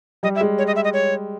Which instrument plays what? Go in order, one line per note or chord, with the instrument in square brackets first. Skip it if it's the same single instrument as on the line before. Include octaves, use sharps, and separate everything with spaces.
[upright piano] G3 [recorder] D#5
[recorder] E5
[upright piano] G#3
[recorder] C#5
D#5
E5
D#5
C#5